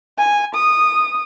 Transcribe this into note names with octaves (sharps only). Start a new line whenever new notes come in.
G#5
D#6